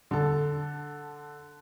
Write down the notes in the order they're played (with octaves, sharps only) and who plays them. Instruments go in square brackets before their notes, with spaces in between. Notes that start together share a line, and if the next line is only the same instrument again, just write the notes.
[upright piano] D3 A4